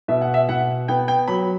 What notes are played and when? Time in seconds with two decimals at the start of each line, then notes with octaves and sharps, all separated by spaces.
0.08 B2 E5
0.21 F#5
0.34 E5
0.49 B2 F#5
0.88 B3 G5
1.08 G5
1.28 F#3 B5